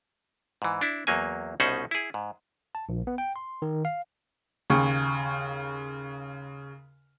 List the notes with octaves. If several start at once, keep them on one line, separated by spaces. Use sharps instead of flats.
G#2 E3
D4 E4
E2 F#3 A#3 G#5
C2 B2 C#4 D#4 C5 F#5
E4 G#4
G#2
A5
A#1
B3
G5
C6
D#3
F5
D#2 C#3 C#6